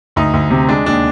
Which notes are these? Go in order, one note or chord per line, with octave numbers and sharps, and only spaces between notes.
D2 D#4
D2
C3
G#3 D4
D#2 D4